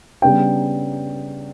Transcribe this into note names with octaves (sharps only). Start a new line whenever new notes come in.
C#3 G3 B3 D4 G5